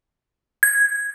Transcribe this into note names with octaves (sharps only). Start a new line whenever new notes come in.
G#6